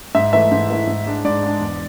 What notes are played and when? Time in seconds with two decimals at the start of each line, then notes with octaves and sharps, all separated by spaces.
0.15 G#2 E5
0.33 E3 A3 E4 E5
0.51 G#2
0.70 E3 A3 E4
0.87 G#2
1.06 G#3 D4
1.25 G#2 D5
1.43 G#3 D4
1.61 E2